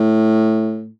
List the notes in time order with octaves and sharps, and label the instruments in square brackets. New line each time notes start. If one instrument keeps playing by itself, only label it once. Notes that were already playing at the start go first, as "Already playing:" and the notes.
Already playing: [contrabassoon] A2